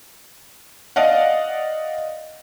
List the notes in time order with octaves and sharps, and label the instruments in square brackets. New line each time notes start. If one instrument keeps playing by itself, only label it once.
[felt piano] D5 D#5 F5 F#5